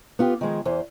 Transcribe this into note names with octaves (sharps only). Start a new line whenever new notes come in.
B3 F4 G4
D#3 F3 G#3 G#4
E2 E3 C5